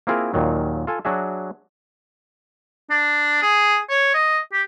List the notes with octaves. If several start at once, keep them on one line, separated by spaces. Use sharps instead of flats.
A#3 C4 E4 F4 G#4 A#4
D#2 A#2 D#3 F#3
F4 A4 G#5
F#3 D4 F#4 G#4 E5
D4
G#4
C#5
D#5
G4